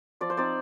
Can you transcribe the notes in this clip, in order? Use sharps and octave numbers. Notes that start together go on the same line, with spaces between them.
F3 D5
C5
C4 D#4 D5